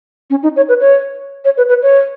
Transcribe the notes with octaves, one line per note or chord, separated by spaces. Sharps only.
C#4
D#4
C#5
B4
C#5
C#5
B4
B4
C#5